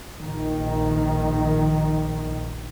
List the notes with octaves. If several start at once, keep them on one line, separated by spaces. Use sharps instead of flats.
A#1 D#3